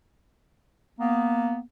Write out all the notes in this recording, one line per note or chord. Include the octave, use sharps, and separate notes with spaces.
A#3 B3